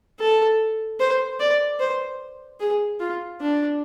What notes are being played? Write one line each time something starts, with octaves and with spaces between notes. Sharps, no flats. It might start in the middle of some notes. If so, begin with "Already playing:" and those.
A4
C5
D5
C5
G#4
F4
D4